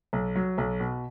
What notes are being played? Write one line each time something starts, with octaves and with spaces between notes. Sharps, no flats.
B1
F#3
B1
B2